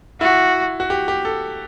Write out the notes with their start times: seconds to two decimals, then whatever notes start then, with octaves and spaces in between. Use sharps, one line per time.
0.21 E4 F#4
0.80 F#4
0.90 G4
1.08 G4
1.25 A4